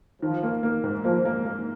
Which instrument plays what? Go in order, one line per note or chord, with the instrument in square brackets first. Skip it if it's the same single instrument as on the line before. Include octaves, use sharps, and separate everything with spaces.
[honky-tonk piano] D#3 [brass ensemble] F3
[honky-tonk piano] A#3
A#3
G#2
[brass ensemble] F3 [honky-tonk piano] A#3
[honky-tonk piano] A#3
A#3